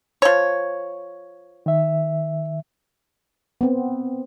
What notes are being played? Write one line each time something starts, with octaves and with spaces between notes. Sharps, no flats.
F3 C#5
D#3 E5
B3 C4